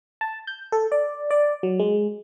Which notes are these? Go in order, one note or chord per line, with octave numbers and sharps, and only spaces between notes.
A5
G6
A4
D5
D5
F#3
G#3